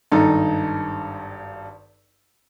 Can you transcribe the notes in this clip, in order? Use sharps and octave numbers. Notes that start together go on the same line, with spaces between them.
G#1 G2 D#4 A4